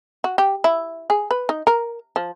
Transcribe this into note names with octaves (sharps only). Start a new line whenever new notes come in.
F#4
G4
E4
G#4
B4
D#4
A#4
F3